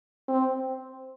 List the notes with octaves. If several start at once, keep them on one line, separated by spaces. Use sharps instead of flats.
C4